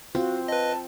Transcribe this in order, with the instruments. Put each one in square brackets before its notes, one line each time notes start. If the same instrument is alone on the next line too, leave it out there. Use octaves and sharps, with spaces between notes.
[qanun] C4 [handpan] F4 [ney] F#4
[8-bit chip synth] B4 D#5 [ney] A5